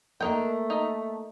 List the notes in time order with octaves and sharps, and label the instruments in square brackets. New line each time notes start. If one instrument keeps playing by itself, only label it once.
[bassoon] A3 [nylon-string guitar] A#3 A#4 [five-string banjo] D4 D#4 G5
[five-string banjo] D#4